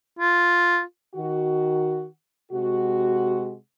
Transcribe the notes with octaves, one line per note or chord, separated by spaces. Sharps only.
F4
D#3 F#4
C3 G#3 F#4